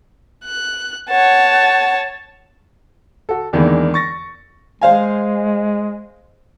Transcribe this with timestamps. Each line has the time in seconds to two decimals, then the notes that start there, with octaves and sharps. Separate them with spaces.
0.44 F#6
1.09 C#5 F#5 A5
3.29 F#4 A4
3.53 E2 D#3 E3 G#3 A#3 D4
3.94 C#6 A6 A#6
4.81 G#3 C5 F5 G#5